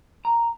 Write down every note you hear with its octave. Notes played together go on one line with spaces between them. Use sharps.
A#5